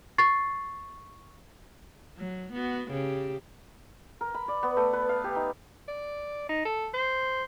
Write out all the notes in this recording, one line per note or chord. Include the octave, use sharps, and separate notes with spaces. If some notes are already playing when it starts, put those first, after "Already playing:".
C#6 A6 C7
F#3
B3 F#4
C#3 G4
A#4
B5
D5
B3
A3
B4
F5
G4
D#4
D5
D#4
A4
C5